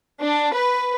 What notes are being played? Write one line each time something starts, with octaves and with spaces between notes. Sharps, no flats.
D4
B4